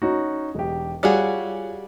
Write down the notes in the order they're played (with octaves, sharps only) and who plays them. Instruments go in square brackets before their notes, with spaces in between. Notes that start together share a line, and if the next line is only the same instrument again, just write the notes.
[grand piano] C#4 D#4 F#4
E1 G4
[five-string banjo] G3 F#4 G#4 [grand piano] F4 C#5 F#5